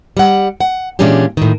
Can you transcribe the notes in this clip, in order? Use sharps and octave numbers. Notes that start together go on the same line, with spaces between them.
G3 F#5
F#5
A#2 E3 G#3 C#4 D4 G4
A2 D#3